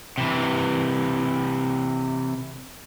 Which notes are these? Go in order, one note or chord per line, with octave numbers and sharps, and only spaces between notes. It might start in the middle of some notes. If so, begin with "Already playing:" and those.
C3 E3